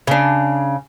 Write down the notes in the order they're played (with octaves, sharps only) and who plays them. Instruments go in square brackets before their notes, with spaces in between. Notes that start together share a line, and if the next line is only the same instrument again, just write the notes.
[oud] C#3 D4